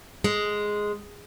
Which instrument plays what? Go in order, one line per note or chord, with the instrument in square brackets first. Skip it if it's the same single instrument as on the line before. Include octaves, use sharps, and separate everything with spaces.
[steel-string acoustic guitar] G#3